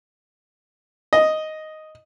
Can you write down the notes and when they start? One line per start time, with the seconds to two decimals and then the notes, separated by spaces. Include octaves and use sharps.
1.13 D#5